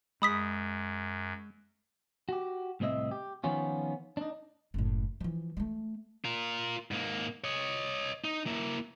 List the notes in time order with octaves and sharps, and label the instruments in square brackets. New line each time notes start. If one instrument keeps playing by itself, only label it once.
[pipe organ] F#2 [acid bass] G#3 [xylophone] B5 D#6 B6
[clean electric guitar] F#4 G4
C2 A2 C4 D#5 E5
G4
D#3 F3 B3 C#4 F4
D4 D#4
[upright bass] F#1 A2
E3 F3
G#3 A3
[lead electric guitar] F4 A#4
G#2 A#3
C#5 D#5
D#4
A#3 E4